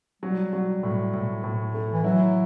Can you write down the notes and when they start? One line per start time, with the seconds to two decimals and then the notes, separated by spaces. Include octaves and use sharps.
0.22 F#3 G3
0.53 F#3
0.83 A2
1.14 A2
1.44 A2
1.74 A3
1.93 E3
2.04 F#3 E4